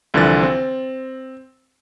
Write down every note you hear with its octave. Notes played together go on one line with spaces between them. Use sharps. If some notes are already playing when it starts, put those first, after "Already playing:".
C2 D3 E3 F3 A6
C4